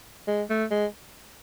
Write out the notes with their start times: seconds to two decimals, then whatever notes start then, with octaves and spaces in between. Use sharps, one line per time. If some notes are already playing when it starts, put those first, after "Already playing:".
0.28 G#3
0.50 A3
0.71 G#3